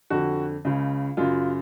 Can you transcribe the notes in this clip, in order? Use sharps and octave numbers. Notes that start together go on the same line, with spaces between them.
F2 D3 F#4
C#2 C#3
F#2 C#3 F4